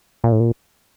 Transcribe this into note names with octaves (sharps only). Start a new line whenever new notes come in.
A#2
A2
A#2